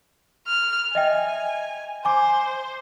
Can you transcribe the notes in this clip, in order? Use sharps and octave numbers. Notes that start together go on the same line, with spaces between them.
F6
D#5 E5 G5 G#5
C5 G#5 D6